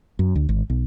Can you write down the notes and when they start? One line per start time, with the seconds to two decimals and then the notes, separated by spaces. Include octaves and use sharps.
0.19 F#2
0.36 D2
0.49 G#1
0.70 B1